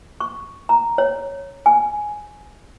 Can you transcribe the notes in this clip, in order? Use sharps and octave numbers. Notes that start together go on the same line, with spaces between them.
C#6
A#5
C#5
G#5